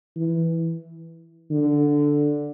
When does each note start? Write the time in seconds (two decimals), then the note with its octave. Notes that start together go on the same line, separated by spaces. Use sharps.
0.16 E3
1.51 D3